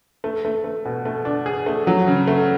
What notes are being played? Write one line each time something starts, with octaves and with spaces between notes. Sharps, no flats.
A3
A3
A3
B2
A3
D4
G#4
A3
F#3
C#3
A3